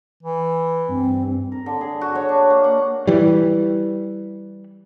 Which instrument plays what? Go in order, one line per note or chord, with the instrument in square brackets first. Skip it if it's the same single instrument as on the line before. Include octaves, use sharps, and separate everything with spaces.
[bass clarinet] E3
[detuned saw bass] G2 [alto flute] C4
[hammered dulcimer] A#4
D3
G#4
F#4
C#5
D4
A#3
F#5
[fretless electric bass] E3 G3